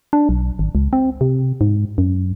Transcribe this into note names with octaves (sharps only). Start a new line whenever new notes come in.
D4
B1
G#1
C#2
C4
C3
G#2
F#2